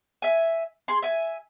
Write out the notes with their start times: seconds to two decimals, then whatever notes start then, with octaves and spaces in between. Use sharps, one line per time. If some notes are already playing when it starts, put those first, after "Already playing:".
0.22 E5 G#5
0.88 G#4 C6
1.02 E5 G#5